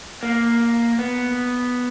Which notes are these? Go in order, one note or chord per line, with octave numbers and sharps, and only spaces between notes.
A#3
B3